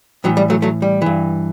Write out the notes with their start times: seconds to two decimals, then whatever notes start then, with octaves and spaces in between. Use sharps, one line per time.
0.24 A2 E3 F#3
0.37 G3
0.50 F#3 A3
0.62 F#3 A3
0.82 G3
1.02 G2 E3